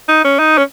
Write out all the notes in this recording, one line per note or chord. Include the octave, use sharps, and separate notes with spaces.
D#4
C#4
D#4
C#4